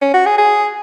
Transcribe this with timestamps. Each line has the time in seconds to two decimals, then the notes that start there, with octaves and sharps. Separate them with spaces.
0.01 C#4
0.14 F#4
0.26 G#4
0.38 G#4